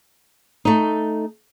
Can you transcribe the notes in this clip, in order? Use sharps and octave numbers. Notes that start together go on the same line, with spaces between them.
A3 D#4